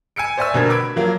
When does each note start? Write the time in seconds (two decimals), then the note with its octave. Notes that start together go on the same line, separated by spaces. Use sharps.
0.16 G#5 E6 C#7 D7
0.37 C5 D5 E5 G#5 C#6 E6
0.53 F1 B2 D3 A#4 G#6
0.69 B5 D6 E6 G#6 D7
0.96 F3 F#3 A#3